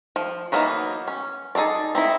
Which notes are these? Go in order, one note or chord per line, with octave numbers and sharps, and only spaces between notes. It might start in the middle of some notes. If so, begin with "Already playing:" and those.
F3
E3 F#3 A#3 B3 D#4
C#4
D#4 G#4 A4 D5
C4 D#4 E4